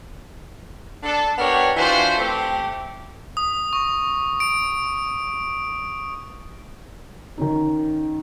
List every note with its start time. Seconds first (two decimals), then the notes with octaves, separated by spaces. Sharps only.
1.04 D4 A4
1.38 B3 D4 G4 A#4 C#5
1.77 E3 D4 F4 F#4 C5
2.18 A3 C4 G4
3.37 D#6
3.73 C#6
4.40 D7
7.38 D#3 C#4 D#4